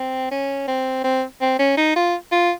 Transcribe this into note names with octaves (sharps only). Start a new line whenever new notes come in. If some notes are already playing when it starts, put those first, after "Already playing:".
Already playing: C4
C#4
C4
C4
C4
C#4
D#4
F4
F4